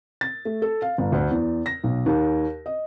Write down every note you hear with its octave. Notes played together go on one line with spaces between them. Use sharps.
A6
A3
A4
F5
G1
D2
E2
A#6
B1
D#2
D#5